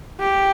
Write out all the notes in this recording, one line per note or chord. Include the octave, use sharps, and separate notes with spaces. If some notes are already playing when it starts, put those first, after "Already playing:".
G4